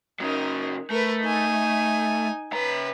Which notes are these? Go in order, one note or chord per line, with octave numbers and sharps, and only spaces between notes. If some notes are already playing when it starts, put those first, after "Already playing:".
C#3 F#3 D#4 A#4
A3 A#4 B4
D#4 G#5
C#3 B4 A#5